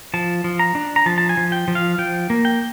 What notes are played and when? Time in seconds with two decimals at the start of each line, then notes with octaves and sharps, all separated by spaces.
0.14 F3 A5
0.44 F3
0.59 A#5
0.75 D4
0.96 A#5
1.06 F3 A5
1.18 A5
1.29 G#5
1.37 F3
1.52 G5
1.68 F3
1.75 F5
1.98 F3 G5
2.30 A#3
2.45 G5